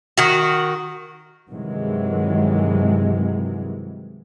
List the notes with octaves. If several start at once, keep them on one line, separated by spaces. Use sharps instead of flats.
D#3 F#4
G2 C3 D#3 E3 F#3 G#3